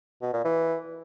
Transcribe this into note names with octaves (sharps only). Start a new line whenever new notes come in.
B2
A#2
E3